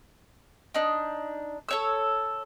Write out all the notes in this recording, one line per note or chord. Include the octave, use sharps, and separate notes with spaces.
D4 D#4
A4 C#5 E6